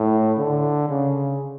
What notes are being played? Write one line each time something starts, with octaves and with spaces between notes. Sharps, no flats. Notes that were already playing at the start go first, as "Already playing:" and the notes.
Already playing: A2
D3
C#3